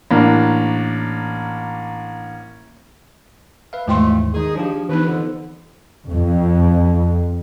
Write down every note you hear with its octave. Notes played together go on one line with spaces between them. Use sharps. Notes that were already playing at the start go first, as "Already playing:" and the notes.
A1 A#3 D4
B4 E5 F5
D#2 G#2 E3 F3 G#3 A3 G5 C6
D#3 D#4 G#4
F3 D4 F4 G4
E3 B3 D#4 B4
F2 D3
F2